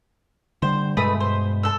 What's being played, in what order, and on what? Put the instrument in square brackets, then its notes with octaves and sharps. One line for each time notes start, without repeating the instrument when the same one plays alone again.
[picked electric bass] D3 G3 [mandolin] C5
[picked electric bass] G2 B2 G#3 [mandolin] A3 B4 D#6
[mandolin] C5
A4 E6